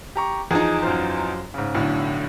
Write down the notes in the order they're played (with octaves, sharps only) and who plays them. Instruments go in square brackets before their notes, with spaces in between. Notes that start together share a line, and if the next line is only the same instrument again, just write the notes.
[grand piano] G4 A#5 C#6
[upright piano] E2 F3 D#4 [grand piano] G#4
[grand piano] F#2 F4 C5
G#2 C#3
[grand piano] B1 [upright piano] A2 D3